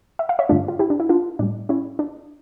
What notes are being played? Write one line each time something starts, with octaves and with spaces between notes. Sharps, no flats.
E5
F5
C#5 E5
G2 D3 A3 D4 F4
F4
E4 G4
D4
E4
D4 F4
A2 G3 D4
C#4 E4
D4